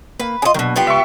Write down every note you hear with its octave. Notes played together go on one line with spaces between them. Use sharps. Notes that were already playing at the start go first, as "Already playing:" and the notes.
A#3 B4
D4 F4 G#4 D#5
B2 D#3 F#3 A#3 D4
B3 F4 G4
C#2 E5 C#6